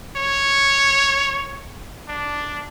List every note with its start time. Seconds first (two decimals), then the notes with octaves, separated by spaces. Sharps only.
0.17 C#5
2.09 D4